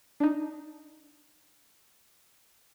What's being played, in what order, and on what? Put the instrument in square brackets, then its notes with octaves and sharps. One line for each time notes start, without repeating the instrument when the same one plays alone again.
[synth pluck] D4 D#4